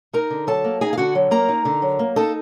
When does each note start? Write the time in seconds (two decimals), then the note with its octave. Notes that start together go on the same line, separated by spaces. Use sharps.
0.13 D#4 A#4 A#5
0.30 D3
0.47 F#3 A4 A5
0.64 A#3
0.81 D#4 G#4 G#5
0.93 F5
0.97 D3 F#4 F#5
1.15 F#3
1.31 A#3 A#4 A#5
1.49 D#4
1.65 D3
1.82 F#3
1.99 A#3
2.16 D#4 A4 A5